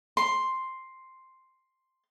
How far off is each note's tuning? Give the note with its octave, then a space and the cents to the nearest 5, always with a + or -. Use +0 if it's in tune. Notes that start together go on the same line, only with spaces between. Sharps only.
C6 +0